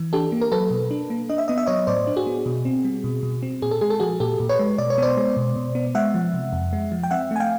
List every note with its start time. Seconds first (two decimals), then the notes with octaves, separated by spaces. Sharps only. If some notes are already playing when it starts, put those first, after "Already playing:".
Already playing: E3
0.13 D4 G4 A4
0.32 A#3
0.41 A#4
0.52 F#3 A4 B4
0.71 B2
0.91 D4
1.10 A#3
1.30 D4 D#5
1.38 E5
1.48 B3 D#5
1.58 E5
1.66 F#3 C#5 D#5
1.87 A2 C5 D5
2.07 D4
2.16 F#4 G#4
2.27 B3
2.46 B2
2.65 C4
2.85 G3
3.04 B2
3.23 B2
3.43 C4
3.62 A#2 G#4
3.71 A4
3.81 G#3 G#4
3.90 A4
4.00 F3 F#4 G#4
4.20 A#2 G4 A4
4.40 A#2
4.49 B4 C#5
4.59 G#3
4.78 B2 D5
4.90 C#5
4.98 B3 C5 D5
5.17 G#3
5.37 B2
5.56 B2
5.75 B3
5.95 G#3 E5 F#5
6.14 F3
6.34 C3
6.53 F2
6.73 G#3
6.92 F3
7.03 G5
7.11 C4 E5 F#5
7.31 A3 G#5
7.40 F5 G5